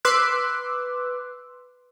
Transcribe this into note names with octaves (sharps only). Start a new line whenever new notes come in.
B4 C6 D6 E6 F#6